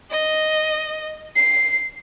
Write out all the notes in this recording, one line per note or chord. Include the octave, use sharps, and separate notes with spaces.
D#5
C7